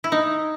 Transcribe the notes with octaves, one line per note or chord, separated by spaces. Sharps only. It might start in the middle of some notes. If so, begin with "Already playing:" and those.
E4
D#4